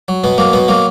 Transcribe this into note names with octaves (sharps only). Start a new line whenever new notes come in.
F#3
B2 B3
F#3 A#3
B2 B3
F#3 A#3